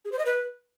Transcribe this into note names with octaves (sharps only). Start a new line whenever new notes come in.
G#4
C5
D#5
B4